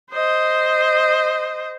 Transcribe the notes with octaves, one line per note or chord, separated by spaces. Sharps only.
C5 D#5